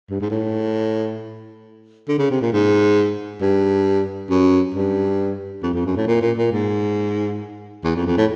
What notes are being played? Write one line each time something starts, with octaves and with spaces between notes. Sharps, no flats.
G2
G#2
A2
D3
C#3
C3
A#2
G#2
G2
F#2
G2
F2
F2
F#2
A2
A#2
A#2
A#2
G#2
E2
F2
F2
A2